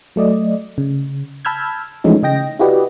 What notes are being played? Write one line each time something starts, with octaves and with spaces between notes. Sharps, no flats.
F#3 A3 D5 D#5
C#3
A5 B5 E6 F6 G6 G#6
E3 F3 G#3 A3 C#4 D#4
C#3 D#5 G5 A#6
E4 F#4 G4 B4 D5 D#5